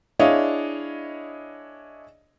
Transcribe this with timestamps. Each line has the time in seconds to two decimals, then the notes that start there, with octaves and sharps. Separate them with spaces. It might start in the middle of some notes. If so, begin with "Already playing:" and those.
0.19 D4 E4 G#4 C#5 D#5 F5